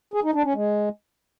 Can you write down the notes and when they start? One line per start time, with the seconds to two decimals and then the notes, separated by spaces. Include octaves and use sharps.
0.14 G#4
0.24 D#4
0.34 D4
0.44 C#4
0.54 G#3